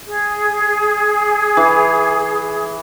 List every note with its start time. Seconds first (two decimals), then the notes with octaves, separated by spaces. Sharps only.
0.07 G#4
1.57 E3